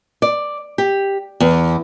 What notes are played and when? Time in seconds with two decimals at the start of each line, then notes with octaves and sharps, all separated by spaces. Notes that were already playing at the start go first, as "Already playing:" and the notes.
0.22 D5
0.78 G4
1.40 E2